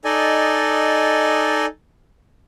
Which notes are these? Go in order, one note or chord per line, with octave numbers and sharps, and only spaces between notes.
D#4 A4 D5 D#5 G#5